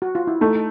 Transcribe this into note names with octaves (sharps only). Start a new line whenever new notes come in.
F#4
F4
E4
A3 D#4